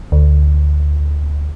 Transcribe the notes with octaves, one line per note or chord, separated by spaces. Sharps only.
D2